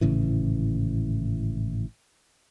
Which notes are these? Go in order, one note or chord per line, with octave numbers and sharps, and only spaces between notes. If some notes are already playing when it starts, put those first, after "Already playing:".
G#1 A2 C#3 E3